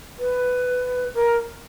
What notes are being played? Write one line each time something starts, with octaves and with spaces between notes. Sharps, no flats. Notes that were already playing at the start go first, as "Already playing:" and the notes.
B4
A#4